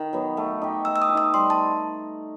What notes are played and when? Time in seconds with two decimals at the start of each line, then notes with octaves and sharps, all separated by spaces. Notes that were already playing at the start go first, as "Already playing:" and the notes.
Already playing: D#3
0.13 F#3 B3
0.37 A3
0.62 D#4 G4
0.85 A3 E6
0.96 E6
1.02 D#6
1.09 G4
1.14 D#4 D#6
1.34 G3 C6
1.50 A5